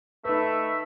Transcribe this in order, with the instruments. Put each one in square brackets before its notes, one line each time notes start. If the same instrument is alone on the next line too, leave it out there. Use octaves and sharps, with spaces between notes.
[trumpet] A3 [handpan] D#4 B4 [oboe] E5